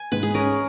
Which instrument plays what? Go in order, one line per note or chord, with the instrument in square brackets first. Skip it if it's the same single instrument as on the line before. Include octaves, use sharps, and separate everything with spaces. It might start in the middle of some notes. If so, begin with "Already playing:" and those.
Already playing: [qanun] G#5
[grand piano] G#2 [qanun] B4
[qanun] G#4
[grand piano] C#4 [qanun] A#4